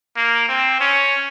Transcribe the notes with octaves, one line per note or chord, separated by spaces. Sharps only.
A#3
C4
C#4